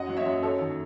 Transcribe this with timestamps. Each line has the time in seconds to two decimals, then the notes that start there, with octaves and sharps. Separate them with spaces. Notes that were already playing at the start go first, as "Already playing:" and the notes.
Already playing: F#2 D#5 F#5
0.08 F#3
0.16 C#5 E5
0.25 F#2
0.43 F#2 A4 C#5
0.60 D#3